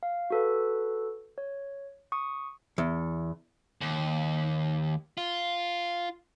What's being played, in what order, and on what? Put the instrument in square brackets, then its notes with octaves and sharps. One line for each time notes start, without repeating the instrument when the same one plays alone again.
[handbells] F5
F#4 A4 B4
C#5
C#6 D#6
[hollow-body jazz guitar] E2
[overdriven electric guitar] D#2
F4